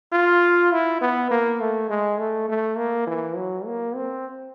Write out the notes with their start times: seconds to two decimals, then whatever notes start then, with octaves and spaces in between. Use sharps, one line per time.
0.13 F4
0.72 E4
1.02 B3
1.31 A#3
1.60 A3
1.90 G#3
2.18 A3
2.49 A3
2.77 A#3
3.07 E3
3.36 F#3
3.66 A#3
3.95 C4